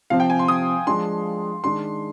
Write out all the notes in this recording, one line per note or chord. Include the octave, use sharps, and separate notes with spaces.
C3 F3 C4 F5
G5
G#5
C6
D#6
F3 G#3 D4 C6
D#3 G#3 D4 C6